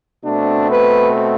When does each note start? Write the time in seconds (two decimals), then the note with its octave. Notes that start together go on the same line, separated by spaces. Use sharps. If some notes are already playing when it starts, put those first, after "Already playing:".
0.24 B2 A3 C4 D4
0.70 B4